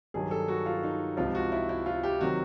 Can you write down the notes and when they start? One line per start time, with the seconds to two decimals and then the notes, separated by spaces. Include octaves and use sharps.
0.14 G2 D#3 F#3 G#4
0.31 A4
0.48 F#4
0.66 F4
0.83 D#4
1.17 C#2 C3 F3 F4
1.35 F#4
1.52 E4
1.69 E4
1.86 F4
2.03 G4
2.21 C3 D#3 F#3 F#4